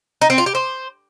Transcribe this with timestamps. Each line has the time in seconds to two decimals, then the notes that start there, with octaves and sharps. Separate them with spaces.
0.21 D#4
0.30 C4
0.38 F4
0.46 G4
0.55 C5